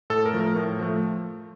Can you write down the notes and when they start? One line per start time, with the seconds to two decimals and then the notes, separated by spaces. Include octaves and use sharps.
0.10 A2 A4
0.26 A#4
0.33 F3 A3
0.40 A#4
0.56 A2
0.79 F3 A3